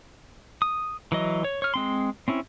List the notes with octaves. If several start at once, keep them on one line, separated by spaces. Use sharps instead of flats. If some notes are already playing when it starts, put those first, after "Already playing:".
D#6
E3 F#3 D#5
C#5
C#5 F6
G#3 C4 C6
C4 C#4 E4